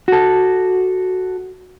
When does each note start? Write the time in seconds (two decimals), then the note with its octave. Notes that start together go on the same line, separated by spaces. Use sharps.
0.08 F#4 A4